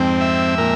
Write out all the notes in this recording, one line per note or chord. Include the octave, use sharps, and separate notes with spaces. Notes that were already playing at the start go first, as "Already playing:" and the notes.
Already playing: F2 G#2 C4
E5
A#2 A#4